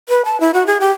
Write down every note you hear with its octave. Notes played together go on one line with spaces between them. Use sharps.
B4
A5
E4
F#4
G#4
G4